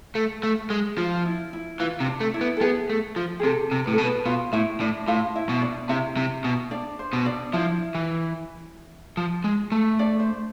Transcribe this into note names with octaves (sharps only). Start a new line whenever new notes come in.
A3
A3
G#3
F3 F4
E4
E4
E3 F4
C3
D4
A3
E4
B3
A4
B3 G#4
A3
F3
G#4
C3 A4
C3
A2 B4
A4
B2
B4
B2 F4 F5
A2 E4 E5
A2 D4 D5
A2 F4 F5
E4 E5
B2
D4 D5
C3 E4 E5
C3
B2
D4 D5
C5
B2
D4 D5
F3 E4 E5
E3
F3
G#3
A3
D4 D5
C5